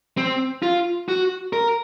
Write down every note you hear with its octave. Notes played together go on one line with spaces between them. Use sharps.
C4
F4
F#4
A#4